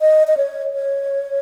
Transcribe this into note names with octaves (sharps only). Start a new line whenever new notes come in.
D#5
D#5
C#5
C#5